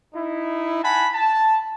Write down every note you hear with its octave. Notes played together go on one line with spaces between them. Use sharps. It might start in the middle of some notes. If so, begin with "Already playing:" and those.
D#4 E4
F#5 G#5 A5 B5
A5